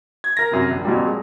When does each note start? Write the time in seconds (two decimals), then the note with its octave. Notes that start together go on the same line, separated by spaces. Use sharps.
0.24 G#6
0.37 A#4 A#6
0.51 F#2 C3
0.71 A#1
0.85 F2 A#2 F#3 G3
1.06 G#3